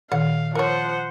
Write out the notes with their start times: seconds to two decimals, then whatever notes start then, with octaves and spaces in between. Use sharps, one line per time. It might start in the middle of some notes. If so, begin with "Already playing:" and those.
0.12 A#2 D#3 F5 F#5
0.55 F3 A#4 C5 C#5 F#5